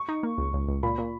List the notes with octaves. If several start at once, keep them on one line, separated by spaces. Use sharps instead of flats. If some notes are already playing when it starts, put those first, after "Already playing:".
Already playing: C#6
D#4
A#3
C#2
C#2
C#2
A#2 B5
A#2